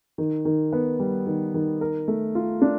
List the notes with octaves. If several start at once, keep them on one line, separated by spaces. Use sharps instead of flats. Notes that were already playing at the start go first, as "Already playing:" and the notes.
D#3
D#3
B3
G3
D#3
D#3
A#4
A3
F4
D4